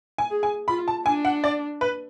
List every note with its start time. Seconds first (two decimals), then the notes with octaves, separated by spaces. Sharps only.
0.18 G#5
0.30 G#4
0.43 G#5
0.68 F4 B5
0.88 A5
1.06 D4 G#5
1.25 F#5
1.44 D5
1.81 B4